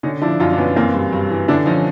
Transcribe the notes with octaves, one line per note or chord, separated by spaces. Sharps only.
D3 C#4 D#4
F3 D4 E4
F#2 D#4 F4
D4
F#2 B3 C#4
E3 A#3 C4
G2
G2
E3
D3 D4 E4
F3 C#4 D#4